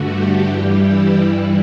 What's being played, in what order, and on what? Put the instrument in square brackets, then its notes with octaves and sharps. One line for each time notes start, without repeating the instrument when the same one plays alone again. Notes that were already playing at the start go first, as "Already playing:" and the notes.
Already playing: [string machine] G2 D3 A3 F#4
G4
G2 E3 G3
E4
G2 E3 G3